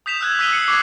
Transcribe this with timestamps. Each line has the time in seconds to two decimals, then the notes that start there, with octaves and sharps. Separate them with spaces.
0.06 D#6 G6 B6 E7 F7
0.21 E6 F#6 G#6
0.39 D#6 E6 B6 D#7 F7 G7
0.51 E6 C7 C#7 F#7
0.68 C#6 D6 G#6 C7